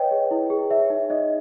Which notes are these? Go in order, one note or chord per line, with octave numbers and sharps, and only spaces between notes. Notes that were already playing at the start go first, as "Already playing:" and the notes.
Already playing: B4 C#5 D#5 G5
G#4
E4
G#4
C#5 E5
D#4
D#4 D#5